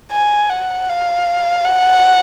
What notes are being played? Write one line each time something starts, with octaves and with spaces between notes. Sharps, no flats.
G#5
F#5
F5
F#5